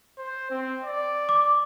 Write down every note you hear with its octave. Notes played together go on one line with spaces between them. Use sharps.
C5
C4
D5
D6